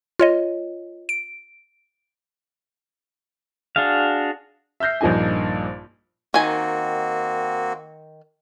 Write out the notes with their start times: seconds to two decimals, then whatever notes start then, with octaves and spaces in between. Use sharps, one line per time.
0.19 F4 C#5 D#5
1.09 D7
3.76 D4 F#4 G#4 F5
4.80 E5 F6 G6 A#6 C7
5.01 A#1 G2 F3 A#3 D#4 G#5
6.34 D#3 A#3 C4 F#4 G#5